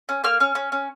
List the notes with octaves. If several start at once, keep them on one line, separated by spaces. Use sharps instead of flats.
C#4
A#3 F6
C#4 F6
C#4
C#4